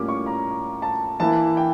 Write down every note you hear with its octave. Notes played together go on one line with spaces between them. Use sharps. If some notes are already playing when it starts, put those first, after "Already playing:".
Already playing: A2 G3 A#3 C#4 F4 D6
C#6
A#5
A5
E3 A#3 E4 A5
G5